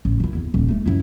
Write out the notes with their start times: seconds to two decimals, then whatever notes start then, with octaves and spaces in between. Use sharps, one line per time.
0.05 A1
0.20 D#3 E4
0.35 E2
0.54 D#1
0.69 G#3 A3
0.86 F#2 E4